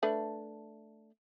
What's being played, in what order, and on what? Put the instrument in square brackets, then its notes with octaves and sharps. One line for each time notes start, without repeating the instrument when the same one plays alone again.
[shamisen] A3 D4 B4